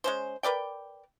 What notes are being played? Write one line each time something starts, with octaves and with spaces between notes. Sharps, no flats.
G#3 C#4 C5
A#4 B4 D5 G5